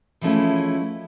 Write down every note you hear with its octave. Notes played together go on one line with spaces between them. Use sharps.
E3 F3 G#3 A3 C#4 E4